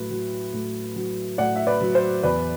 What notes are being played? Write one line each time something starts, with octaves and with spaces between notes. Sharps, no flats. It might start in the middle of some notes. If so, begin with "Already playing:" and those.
Already playing: A2 F#3 B4
F#3
A2
F#3
A2 D5 F#5
E5
B4 D5
F#3
C5
E2 B4 D5